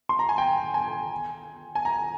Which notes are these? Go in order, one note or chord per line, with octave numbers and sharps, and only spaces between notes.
C6
A#5
G#5
G5
G#5
G#5
A#5